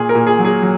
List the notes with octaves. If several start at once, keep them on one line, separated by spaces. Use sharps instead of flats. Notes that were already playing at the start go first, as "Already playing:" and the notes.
Already playing: A#2 G#4
A#4
A#2
G#4
F#3
G#4
F#3